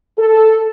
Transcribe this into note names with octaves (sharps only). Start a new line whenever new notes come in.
A4